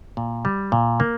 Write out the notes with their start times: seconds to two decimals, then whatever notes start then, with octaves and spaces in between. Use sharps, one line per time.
0.17 A#2
0.45 G3
0.72 A#2
1.00 A#3